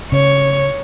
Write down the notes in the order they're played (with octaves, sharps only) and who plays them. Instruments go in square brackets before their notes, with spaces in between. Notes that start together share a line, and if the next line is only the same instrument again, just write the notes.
[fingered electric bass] C#3 [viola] C#5